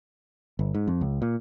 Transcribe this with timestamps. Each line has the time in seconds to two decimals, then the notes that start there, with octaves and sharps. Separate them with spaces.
0.59 G1
0.75 G#2
0.87 F2
1.01 C#2
1.22 A#2